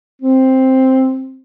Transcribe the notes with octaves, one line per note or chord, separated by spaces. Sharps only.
C4